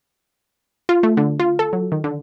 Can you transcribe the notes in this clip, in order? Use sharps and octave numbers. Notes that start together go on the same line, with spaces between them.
F4
A3
D3
F4
A4
F#3
D#3
D3